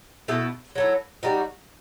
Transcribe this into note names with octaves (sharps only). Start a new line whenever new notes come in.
B2 A3 E4 A4
F#3 A3 E4
G3 D#4 F#4